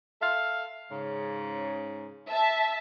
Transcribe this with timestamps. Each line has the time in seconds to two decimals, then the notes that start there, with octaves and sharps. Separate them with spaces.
0.22 A4 E5 F5
0.91 G#2 C#3
2.29 E5 A5